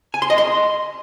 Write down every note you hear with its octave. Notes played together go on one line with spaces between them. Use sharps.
G#5
C6
D#5
C6